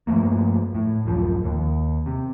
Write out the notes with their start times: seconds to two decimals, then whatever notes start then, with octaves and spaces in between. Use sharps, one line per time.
0.07 G2 F3 A3 A#3
0.75 A2
1.05 D1 F#2 F3
1.44 D#2
2.06 C3